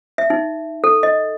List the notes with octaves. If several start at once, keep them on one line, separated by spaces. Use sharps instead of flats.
E5
D#4
A4
D#5